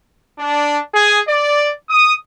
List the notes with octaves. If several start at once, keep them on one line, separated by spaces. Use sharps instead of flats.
D4
G#4
D5
D#6